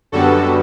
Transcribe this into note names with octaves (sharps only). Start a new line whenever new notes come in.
F#2 D3 G3 B3 F#4 A4